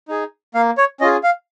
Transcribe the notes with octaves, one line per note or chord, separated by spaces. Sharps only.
D#4 G#4
A#3 F5
C#5
C#4 F4 G#4 D#5
F5